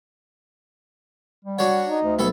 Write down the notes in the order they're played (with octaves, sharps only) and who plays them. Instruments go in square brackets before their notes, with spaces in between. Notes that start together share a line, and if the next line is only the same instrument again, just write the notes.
[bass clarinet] G3
[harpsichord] D4 F#4 C#5 [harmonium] F#5
[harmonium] D#4
[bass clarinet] D2
[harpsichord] B1 A4 B5